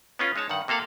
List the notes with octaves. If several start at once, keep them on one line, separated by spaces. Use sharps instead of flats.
B3 C#4 F4
G#3 D#4 C#5 A5
G2 D#3 F#5
C3 A#3 A4 F5 F#5